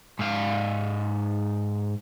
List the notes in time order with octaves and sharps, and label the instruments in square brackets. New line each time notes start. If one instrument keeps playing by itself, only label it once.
[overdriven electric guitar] G#2 F5